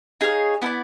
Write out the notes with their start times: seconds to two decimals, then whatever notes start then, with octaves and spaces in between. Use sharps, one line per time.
0.21 D#4 G#4 C#5 F5
0.62 B3 E4 A4 D5